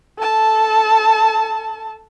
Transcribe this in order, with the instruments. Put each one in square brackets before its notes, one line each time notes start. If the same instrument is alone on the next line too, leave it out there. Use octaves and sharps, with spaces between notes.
[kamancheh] A4 A5